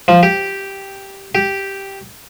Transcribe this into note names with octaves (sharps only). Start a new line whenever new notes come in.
F3
G4
G4